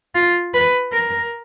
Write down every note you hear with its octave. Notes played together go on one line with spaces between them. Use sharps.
F4
B4
A#4